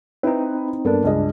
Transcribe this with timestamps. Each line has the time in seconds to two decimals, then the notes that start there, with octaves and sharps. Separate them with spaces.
0.23 C4 D#4 E4 B4
0.85 G2 A#3 B3 D4 A4
1.04 C#2 G#4 D#5